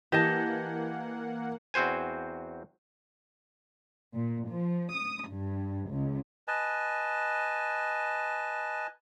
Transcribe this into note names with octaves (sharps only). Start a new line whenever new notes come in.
E3 A#3 G4 D#5 F#5 A5
E2 C4 F#4 C5 G#5
A#2
F3
D#6
G2
C#2
B4 D#5 G#5 A5